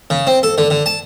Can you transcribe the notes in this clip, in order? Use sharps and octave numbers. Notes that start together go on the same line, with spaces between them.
C#3
C4
A4
D3
D3
A5